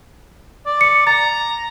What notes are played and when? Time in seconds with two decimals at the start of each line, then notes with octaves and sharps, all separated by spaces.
0.66 D5
0.81 C#7
1.07 A#5 A6